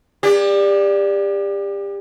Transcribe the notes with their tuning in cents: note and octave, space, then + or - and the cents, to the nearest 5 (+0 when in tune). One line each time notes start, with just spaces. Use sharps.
B3 -40 G4 +30 D5 +0